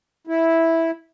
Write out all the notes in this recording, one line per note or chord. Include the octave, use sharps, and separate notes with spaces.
E4